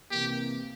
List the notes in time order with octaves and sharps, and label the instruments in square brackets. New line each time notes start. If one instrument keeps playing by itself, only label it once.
[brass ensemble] C3 E3 A#3 [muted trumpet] G4